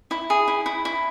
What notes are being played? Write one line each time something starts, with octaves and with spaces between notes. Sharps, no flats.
E4
G#4
E4
E4
E4